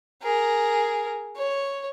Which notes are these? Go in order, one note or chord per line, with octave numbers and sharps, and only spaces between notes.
G#4 A#4
C#5